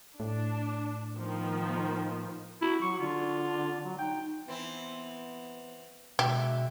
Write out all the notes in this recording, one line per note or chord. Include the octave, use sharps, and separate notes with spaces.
A2 D4
D#3 F3 B3
E4 F#4
F#3 C#6
D3 F4
F#3
D#4 G5
E3 B3 C4 E4
B2 D3 G#3 G4 E5